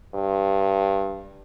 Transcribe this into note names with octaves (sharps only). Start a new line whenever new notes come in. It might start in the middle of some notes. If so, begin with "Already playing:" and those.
G2